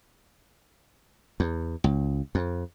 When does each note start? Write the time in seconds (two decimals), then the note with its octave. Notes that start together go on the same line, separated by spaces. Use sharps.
1.40 E2
1.84 C#2
2.35 F2